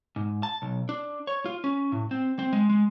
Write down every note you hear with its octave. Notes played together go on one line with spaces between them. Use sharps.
G#2
A5
B1
D4
C#5
F4
C#4
A2
C4
C4
G#3
G#3